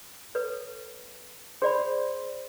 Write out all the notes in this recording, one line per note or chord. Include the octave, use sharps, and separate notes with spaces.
A4 B4 C#5
G#4 C5 D5 B5